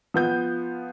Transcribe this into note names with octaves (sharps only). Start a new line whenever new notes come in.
F3 B3 G6